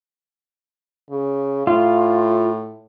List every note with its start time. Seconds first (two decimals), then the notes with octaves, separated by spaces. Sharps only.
1.10 C#3
1.67 A2 F4